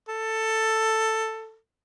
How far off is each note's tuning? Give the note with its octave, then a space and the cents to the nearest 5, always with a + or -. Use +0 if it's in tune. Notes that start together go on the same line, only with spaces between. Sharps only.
A4 +10